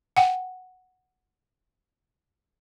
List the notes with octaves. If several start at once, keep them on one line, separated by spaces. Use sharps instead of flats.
F#5 G5